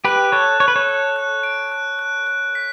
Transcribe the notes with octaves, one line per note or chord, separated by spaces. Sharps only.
G4 B4 F#6
A4 C#5 F#6
C#5 F#6
B4
A4 C#5
F#6
F#6
D7
F#6
F#6
F#6
B6